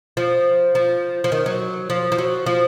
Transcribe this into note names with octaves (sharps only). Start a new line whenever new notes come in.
F3
F3
F3
D#3
F#3
F3
F3
F#3
F3